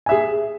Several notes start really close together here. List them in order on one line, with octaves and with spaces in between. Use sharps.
G#5 E5 G#4